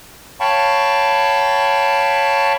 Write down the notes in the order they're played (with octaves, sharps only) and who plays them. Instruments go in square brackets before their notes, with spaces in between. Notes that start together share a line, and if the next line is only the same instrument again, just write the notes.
[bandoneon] C#5 F5 G5 A5 B5 C#6